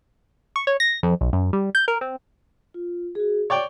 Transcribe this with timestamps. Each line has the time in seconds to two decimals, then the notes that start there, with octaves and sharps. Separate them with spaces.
0.56 C#6
0.67 C#5
0.80 A#6
1.03 F2
1.21 B1
1.33 F#2
1.53 G3
1.75 G6
1.88 A#4
2.01 C4
2.74 F4
3.15 F#4 G#4
3.50 C#5 D5 G5 C#6